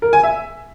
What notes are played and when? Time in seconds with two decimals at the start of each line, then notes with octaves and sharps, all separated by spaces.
0.02 A#4
0.13 G#5
0.23 E5